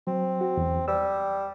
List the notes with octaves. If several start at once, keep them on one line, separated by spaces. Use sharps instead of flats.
F#3 C4
F#4
E2
G3 E6